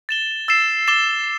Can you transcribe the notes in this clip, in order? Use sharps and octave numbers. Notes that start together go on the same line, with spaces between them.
A6 E7 G7
E6 A6 C7 E7
D6 A6 E7 G7